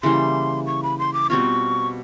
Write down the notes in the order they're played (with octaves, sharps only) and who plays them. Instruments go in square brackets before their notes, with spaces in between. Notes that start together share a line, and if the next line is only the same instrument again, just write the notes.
[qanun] C#3 E3 G3 A#3 [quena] C6
[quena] C#6
B5
C6
D6
[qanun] B2 G3 C4 F4 [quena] C#6